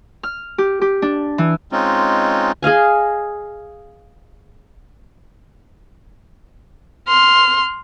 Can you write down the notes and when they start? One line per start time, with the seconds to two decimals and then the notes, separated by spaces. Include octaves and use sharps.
0.23 F6
0.58 G4
0.81 G4
1.02 D4
1.38 E3
1.72 G#3 C4 C#4 D#4 F4
2.62 G#4 D#5 F5 G#5
7.08 C6 F6